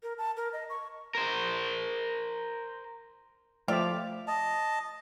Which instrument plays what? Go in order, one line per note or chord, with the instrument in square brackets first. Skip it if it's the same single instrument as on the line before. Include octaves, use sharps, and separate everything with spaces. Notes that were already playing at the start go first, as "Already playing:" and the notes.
[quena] A#4
A5
A#4
D#5
C#6
[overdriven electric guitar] A#4 C5
[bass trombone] F3 [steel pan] A3 D5 E5 [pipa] G4 F5
[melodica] D#5 A5